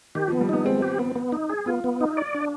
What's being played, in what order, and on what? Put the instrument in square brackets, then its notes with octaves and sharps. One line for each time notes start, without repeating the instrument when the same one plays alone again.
[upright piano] D#3 [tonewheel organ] G4
[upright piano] F3
[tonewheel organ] B3
[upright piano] G3
[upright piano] B3 [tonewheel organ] D#4
[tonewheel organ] G#3 [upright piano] C4
[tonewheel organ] G4
B3
B3
D#4
G#4
[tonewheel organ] B3 [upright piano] F4
[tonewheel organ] B3
D#4
D5
D4